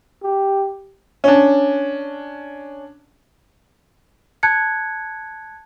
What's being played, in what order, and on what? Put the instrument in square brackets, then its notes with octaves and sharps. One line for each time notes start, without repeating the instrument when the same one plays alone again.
[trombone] G4
[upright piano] C#4 D4
[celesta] A5 F#6 G#6 C#7